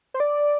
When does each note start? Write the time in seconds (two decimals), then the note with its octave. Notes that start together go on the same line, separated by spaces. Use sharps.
0.14 C5
0.20 D5